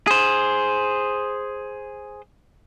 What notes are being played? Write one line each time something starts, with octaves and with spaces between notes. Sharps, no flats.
G#4 C5